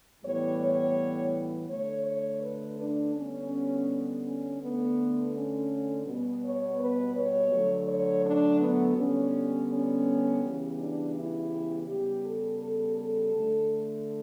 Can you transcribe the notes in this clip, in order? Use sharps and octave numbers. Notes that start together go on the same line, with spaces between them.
A2 E3 G3 B3 C#5
C#5
D3 A3 C#5
C#5
B4
D4
D3 G3 B3 C#4
C#4
D3 A3 B3
C#4
B2 G3 B3
C#5
B4
C#5
D3 F#3 A3
C#5
D4
B3
D3 G3 B3 C#4
C#4
C#3 E3 G3 B3
D4
E4
C#3 G3 B3 G4
A4
A4
A4
D3 A3